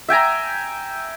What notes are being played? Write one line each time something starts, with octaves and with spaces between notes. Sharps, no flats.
E5 G5 G#5 A#5